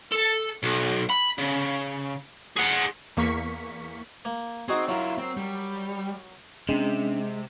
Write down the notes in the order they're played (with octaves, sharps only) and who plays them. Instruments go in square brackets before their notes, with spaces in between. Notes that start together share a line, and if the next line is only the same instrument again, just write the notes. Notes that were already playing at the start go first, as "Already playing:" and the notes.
[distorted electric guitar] A4
B1
B5
C#3
G#4 F#5
[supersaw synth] E2 A#3 C#6 B6
[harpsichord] A#3
[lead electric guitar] C4 [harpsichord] D#4 F#4 G#4
[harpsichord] F#3 A#4 [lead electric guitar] E4 F4
[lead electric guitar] C4
G3
[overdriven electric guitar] C3 [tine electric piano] G#3 [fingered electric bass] C#4 D4